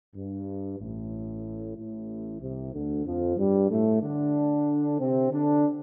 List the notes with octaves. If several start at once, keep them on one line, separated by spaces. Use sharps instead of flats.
G2
A1 A2
A1 A2
C2 C3
D2 D3
F2 F3
G2 G3
A2 A3
D3 D4
C3 C4
D3 D4